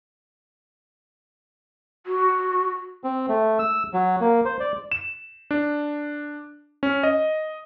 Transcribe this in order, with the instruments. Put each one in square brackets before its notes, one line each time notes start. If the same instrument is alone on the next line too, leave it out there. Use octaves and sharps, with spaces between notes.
[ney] F#4
[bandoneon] C4
A3
E6
F#3
A#3
C5
D5
[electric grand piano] E7
D4
C#4
D#5